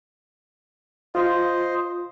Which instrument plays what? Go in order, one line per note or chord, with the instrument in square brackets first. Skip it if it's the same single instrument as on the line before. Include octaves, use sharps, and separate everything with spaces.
[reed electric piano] F4 [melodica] C5 D#5